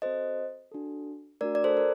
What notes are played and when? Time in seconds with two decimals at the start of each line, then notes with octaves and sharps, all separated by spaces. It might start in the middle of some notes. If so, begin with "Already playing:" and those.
0.02 C4 F#4 A4 C5 D#5
0.72 D4 F#4 A4
1.41 A3 D4 F#4 A#4 D5
1.55 D5
1.64 A4 C5
1.77 A#4